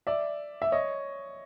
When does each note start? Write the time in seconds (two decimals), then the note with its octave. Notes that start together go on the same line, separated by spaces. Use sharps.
0.07 D5 E5
0.62 E5
0.72 C#5 D#5